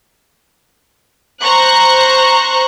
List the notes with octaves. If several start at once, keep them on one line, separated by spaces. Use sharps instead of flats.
C5 A#5 C#6 F#6